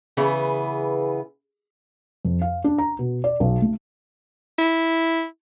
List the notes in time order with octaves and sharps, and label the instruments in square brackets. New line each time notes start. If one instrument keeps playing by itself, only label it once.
[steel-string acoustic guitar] C#3 E3 B3 G#4
[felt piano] F2
F5
D4
A#5
B2
D5
B1
A3
[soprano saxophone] E4